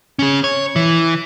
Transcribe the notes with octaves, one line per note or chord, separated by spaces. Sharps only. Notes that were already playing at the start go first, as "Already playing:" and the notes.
C#4 G#4
C#5
E3